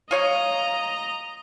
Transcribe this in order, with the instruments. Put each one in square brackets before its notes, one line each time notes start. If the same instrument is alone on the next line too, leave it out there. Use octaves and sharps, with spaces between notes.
[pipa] F4 C#5 F5 [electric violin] D#5 A#5